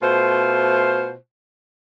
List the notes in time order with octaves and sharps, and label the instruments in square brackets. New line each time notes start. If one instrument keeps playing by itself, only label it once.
[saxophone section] B2 A3 F4 C5